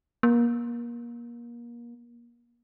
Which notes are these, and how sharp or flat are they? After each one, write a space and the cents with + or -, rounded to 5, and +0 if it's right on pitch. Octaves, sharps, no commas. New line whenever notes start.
A#3 +30